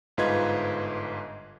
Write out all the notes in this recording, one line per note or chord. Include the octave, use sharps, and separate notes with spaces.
G1 G#2 F4 B4 D#5 G#6